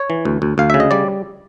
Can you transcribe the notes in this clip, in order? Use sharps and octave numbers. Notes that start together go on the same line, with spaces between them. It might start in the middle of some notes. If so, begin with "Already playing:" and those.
Already playing: C#5
E3
D2
D2
D2 F5
C#3 E5
D#5
G3 D5